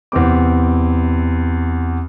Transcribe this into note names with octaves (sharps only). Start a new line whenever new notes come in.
E2 C3 C4 D6